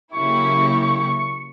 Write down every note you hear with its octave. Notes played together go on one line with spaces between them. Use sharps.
C#3 F#3 A#3 E4 G4 C#6